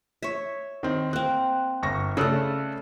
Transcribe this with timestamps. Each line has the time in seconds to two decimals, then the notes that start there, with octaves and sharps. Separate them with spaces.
0.22 C#5 E5
0.83 D#3 C4
1.13 A#3 C4 F#6
1.83 G1 C#6 A#6
2.17 C#3 A3 A4 D5 F#6